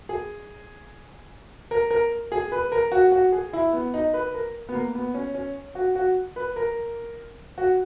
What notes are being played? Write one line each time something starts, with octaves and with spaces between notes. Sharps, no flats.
G#4
A#4
A#4
G#4
B4
A#4
F#4
F#4
G#4
E4
B3
D#4
B4
A#4
B3
A#3
B3
C#4
C#4
F#4
F#4
B4
A#4
F#4